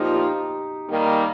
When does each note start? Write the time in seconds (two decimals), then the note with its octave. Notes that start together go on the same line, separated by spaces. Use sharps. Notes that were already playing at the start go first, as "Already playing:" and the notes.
Already playing: A#2 F3 A#3 D#4 F4 G4
0.16 D#4 G4
0.89 D#3 G3 A#3